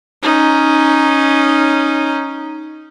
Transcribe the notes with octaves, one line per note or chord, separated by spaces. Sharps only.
C#4 D#4